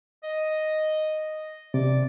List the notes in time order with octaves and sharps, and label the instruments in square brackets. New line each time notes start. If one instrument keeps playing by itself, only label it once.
[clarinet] D#5
[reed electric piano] C3 [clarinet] D5